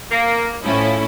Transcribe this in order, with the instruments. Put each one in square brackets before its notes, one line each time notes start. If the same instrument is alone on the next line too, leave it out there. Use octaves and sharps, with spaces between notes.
[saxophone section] A#3
[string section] A2 C#4 E4 [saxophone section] F3